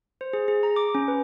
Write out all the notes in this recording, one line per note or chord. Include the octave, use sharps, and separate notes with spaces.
C5
G#4
G#4
A#5
D6
C#4
B4